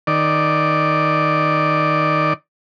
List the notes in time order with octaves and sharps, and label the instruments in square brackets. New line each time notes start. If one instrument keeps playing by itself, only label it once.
[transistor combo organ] D#3 D5